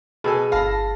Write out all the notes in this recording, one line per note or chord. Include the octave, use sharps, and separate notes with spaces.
B2 G#4 A4 G#5
G1 F5 A5 B5 A#6